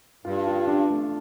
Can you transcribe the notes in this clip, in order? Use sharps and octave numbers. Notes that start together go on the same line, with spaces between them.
G2 F4
F4
D4
A3